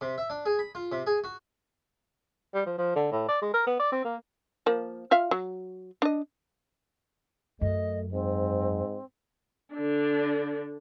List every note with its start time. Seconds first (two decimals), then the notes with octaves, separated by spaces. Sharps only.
0.01 C3
0.18 E5
0.30 D4
0.46 G#4
0.59 B5
0.75 F4
0.92 C3
1.07 G#4
1.24 F#4
2.54 G3
2.66 F3
2.78 F3
2.96 D3
3.12 A2
3.29 D5
3.42 G#3
3.54 A#4
3.67 B3
3.80 D5
3.92 C4
4.05 A#3
4.66 F3 A#3
5.11 F4 E5 F5
5.31 F#3
6.02 D4 D#5
7.61 F#2 A3 D#5
8.12 G#2 C4
9.74 D3 D4